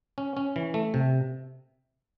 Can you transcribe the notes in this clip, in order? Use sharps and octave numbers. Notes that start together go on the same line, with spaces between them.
C#4
C#4
E3
A3
C3